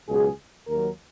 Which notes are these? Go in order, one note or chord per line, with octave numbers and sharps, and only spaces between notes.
C#2 B2 F#3 G#4
D#2 D#3 F#3 A#4